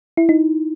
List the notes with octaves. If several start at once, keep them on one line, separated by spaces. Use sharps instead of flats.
E4
D#4